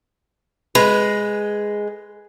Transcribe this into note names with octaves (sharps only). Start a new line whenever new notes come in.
G#3 B4